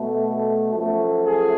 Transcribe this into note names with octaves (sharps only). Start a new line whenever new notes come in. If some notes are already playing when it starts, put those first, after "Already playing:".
Already playing: B2 A3
F#2 F3 A3
G#4